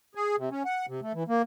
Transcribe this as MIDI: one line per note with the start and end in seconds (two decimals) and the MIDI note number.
0.15 0.36 68
0.37 0.49 48
0.51 0.63 61
0.65 0.86 78
0.88 1.00 48
1.02 1.12 57
1.14 1.23 52
1.28 1.42 58